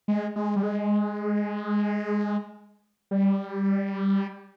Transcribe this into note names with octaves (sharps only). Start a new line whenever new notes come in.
G#3
G#3
G3
G#3
G3